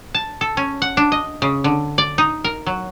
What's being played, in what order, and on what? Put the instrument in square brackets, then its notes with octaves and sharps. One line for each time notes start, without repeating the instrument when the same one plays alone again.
[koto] A5
A4
C#4
F#5
D4
D#5
C#3
D3
D5
D#4
A#4
F#3